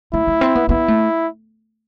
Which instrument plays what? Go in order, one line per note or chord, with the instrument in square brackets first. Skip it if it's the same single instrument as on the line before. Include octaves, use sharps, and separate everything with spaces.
[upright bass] A3 [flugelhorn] E4
[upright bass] A3
C4
B3
[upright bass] B3 [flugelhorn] E4
[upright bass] A3